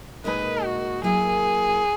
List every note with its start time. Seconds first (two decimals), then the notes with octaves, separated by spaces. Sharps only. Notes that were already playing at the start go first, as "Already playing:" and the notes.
0.24 A#2 G#3 D#4 A#4 B4 D#5
0.64 F#4
1.03 F#3 A#3 E4 G#4 A#4